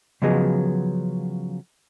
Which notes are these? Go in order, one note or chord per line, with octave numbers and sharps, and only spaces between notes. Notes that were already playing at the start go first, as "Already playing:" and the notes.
C#3 F3 F#3 B3 G#4 D#5